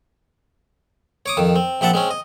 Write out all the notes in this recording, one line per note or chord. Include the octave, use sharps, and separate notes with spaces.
C#5 D6 D#6
F2 D#3
C4
A#1 C4 E5 F#5 A5
G#3 C4 C#4
D#5